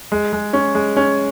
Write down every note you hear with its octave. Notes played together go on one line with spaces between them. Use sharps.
G#3
G#3
C#4
G#3
C#4